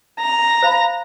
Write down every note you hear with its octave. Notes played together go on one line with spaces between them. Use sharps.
A#5
C5 F5 B5